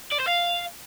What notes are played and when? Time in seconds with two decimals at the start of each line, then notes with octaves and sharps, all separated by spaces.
0.12 D5
0.20 C5
0.28 F5